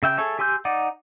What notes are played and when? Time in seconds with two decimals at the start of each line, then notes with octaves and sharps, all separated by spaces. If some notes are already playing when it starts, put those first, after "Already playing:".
0.03 C#3 E5 G5
0.17 G#4 A4 C#5 E5
0.39 G4 G#5 C6 E6 G6
0.65 D#4 D5 F#5